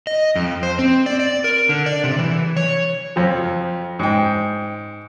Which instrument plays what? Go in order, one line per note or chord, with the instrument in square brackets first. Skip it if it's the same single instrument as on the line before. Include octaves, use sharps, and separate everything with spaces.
[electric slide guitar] D#5
F2
C5
C4
D5
D5
A#4
D3
D5
C3
E3
C#5
[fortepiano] F2 F3
G#2 G5